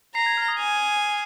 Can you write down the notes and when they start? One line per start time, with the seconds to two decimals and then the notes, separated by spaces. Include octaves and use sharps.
0.15 A#5 C7
0.26 G#6
0.37 F6
0.48 D#6
0.59 G#5 D#6